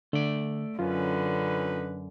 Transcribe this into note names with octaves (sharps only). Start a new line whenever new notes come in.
D3 A3 D5
F#2 D3 C#4 D#4 F4 B4